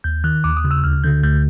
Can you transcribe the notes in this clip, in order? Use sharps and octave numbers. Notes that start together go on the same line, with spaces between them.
D#2 G6
D#3 F#6
D#2 D6
D#6
C#3
E6
D2 F6
D3 G6
D2 G6